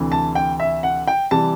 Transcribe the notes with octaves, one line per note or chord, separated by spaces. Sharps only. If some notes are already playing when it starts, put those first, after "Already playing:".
Already playing: D2 C3 E3
A5
G5
E5
F#5
G5
C3 E3 G3 A5